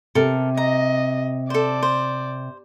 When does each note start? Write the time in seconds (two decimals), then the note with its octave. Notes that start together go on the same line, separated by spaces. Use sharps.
0.15 C3 A4 A#4
0.57 D#5 A#5
1.50 A4 C5 D5
1.83 C5